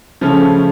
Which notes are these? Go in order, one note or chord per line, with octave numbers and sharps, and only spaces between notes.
C#3 F3 A3 C#4